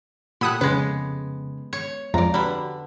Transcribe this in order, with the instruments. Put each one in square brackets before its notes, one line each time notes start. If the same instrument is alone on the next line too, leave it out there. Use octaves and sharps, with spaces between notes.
[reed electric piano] A#2 F#5 G#6 [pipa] G4 A4 [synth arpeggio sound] B5 D#6 F#6
[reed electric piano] F2 C#3 [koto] G#3 B3 [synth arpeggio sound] B4
[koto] C#5
[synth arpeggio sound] F2 [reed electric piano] G#3 F4 [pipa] D5 A#5
[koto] D3 [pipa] G3 B5 [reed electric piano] F#4 B4